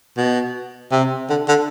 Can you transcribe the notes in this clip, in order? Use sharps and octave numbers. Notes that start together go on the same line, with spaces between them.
B2
C3
D3
D3